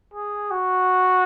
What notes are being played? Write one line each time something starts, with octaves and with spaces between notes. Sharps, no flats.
G#4
F#4